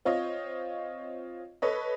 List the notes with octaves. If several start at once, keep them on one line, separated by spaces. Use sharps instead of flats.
C4 F4 C#5 D#5
A4 B4 C#5 D#5